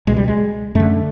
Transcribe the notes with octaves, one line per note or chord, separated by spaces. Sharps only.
C#2 B2 G#3
G3
G#3
F#2 D3 A3